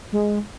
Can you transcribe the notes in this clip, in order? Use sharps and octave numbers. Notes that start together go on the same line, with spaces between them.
G#3